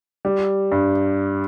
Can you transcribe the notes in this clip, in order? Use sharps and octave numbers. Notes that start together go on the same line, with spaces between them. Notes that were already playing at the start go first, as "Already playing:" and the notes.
G3
G2